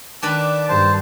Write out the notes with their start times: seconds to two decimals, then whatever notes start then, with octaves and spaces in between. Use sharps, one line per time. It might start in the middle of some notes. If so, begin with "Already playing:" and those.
0.23 D#3 D4 B4 A5 D6
0.69 G2 C5 A5